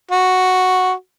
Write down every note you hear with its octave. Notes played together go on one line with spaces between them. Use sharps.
F#4